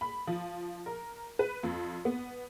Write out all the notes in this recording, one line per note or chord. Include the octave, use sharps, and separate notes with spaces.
B5
F3
A#4
B4
F2
B3